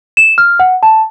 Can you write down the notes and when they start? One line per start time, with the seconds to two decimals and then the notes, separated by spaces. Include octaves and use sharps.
0.17 E7
0.38 F6
0.60 F#5
0.83 A5